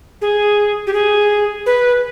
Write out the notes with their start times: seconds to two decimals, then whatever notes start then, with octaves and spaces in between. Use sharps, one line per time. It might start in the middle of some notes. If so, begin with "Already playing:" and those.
0.21 G#4
0.87 G4
0.94 G#4
1.66 B4